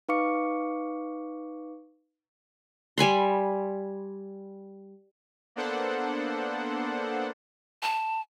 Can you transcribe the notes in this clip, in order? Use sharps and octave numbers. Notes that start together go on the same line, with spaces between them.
D#4 B4 F5 C#6 D6 C#7
G3 G#5 B5 C6
A#3 B3 D4 A4 C5 F#5
A5